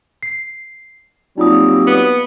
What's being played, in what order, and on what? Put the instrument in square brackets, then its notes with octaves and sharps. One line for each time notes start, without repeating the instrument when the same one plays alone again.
[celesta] C7
[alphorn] F#3 [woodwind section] G3 A#3 C4 [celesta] D#4 F4 D#6
[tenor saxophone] B3